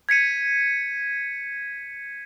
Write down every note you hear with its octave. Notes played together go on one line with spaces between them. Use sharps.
G#6 B6 C#7 D#7